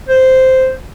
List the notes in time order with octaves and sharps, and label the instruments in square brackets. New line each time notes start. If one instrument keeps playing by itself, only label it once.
[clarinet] C5